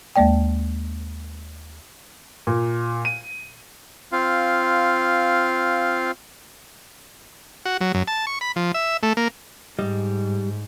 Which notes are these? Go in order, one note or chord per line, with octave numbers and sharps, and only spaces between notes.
D#2 G#3 A#3 D5 G5
A#2
D#7
C4 F4 F5
F#4
F#3
F#2
A5
C#6
B5
F3
E5
A3
A#3
G#2 G3 D#5